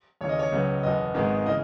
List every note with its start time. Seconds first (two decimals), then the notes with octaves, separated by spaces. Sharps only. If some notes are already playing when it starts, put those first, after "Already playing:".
0.21 D#2 C#3 E3 C#5
0.29 D#5
0.39 C#5
0.52 C#2 C#3 F#3 B3
0.83 F#1 E2 B2 D#5
1.14 G#1 G#2 D#3 G#3 B3
1.46 C#3 E3 D#5